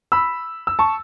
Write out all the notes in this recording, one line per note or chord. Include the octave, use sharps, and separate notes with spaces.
B5 E6
E6
A5 C#6